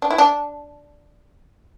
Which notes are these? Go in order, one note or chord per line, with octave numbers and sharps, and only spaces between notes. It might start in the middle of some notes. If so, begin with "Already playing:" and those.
D4
E4
D4